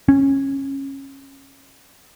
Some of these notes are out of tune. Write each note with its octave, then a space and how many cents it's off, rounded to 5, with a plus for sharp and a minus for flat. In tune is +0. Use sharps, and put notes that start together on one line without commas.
C#4 -20